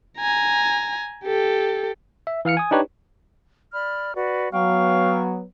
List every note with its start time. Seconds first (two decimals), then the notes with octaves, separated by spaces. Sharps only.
0.18 G#5 A#5
1.24 G4 A4
2.27 E5
2.45 E3 F5 F6 C#7
2.57 G#5 D#6
2.71 D4 D#4 G4 B4 C#5
3.73 D5 B5 F6
4.15 F#4 B4 D5
4.53 F#3 B3 F5 G5 C#6